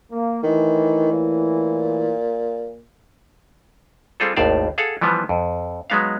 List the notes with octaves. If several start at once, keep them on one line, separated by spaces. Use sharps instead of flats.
A#3
A2 D#3 E3
A#2
G3 C4 F4 G#4 A4
G#1 D#2 A2 C5 D5 F5
G#4 A4 F5 F#5
E3 F3 G3 B3
F2
F#3 G#3 B3 D#4 F5